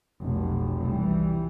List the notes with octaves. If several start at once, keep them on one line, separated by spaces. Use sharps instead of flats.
F1 B1
C2 E3 G3